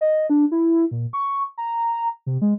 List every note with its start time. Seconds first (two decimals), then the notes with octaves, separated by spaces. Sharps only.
0.01 D#5
0.30 D4
0.52 E4
0.91 A#2
1.13 C#6
1.58 A#5
2.26 C3
2.42 G#3